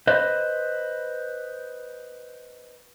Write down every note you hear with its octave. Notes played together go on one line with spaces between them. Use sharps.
B4 C5 D#5